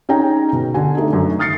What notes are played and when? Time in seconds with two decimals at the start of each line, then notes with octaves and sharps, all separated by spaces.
0.09 C#4 D#4 G#4 G5 A#5
0.53 B2
0.74 D3 G#5
0.97 A3 D4 D#4
1.13 F#2 D#3
1.39 D#6 F6 A6 C7 C#7